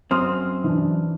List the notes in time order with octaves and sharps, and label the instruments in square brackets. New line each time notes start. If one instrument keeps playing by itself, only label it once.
[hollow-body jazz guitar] F#2 C4 [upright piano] C6 D#6 F6
[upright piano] E3 D4